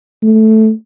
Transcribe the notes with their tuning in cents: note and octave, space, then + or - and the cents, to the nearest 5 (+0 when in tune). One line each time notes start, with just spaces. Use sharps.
A3 -5